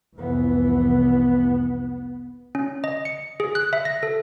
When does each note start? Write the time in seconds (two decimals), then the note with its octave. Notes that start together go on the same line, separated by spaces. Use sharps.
0.18 F1 C2 E3 B3
2.55 C#4
2.84 D#5
3.05 C#7
3.40 G#4
3.55 F#6
3.73 E5
3.85 A#6
4.03 A4